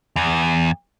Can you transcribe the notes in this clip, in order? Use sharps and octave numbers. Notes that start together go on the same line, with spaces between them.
E2